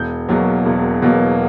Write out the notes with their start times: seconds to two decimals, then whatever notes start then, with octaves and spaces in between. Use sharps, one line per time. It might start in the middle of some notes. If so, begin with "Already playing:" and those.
Already playing: E1 G6
0.28 E2 B2 F#3 A#3
0.65 E1
1.02 E2 B2 F#3 A#3